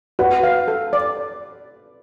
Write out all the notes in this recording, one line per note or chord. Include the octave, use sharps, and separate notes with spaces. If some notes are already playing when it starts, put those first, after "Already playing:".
F#4 B4
F5
A4
D5